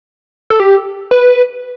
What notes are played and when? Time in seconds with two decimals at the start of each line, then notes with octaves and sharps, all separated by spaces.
0.50 A4
0.60 G4
1.11 B4